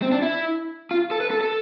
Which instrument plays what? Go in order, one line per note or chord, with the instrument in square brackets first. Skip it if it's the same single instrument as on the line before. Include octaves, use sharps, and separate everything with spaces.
[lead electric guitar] C4
D4
E4
F4
A4
B4
A4
A4